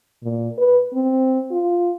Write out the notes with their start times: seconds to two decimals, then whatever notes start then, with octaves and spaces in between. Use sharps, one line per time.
0.23 A#2
0.57 B4
0.94 C4
1.51 F4